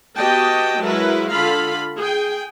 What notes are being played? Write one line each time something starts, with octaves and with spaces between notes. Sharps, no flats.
B3 F#4 G4 D#5 G5 A5
F#3 G#3 E4 A#4 B4
D3 F4 A4 F5 B5
G#4 G5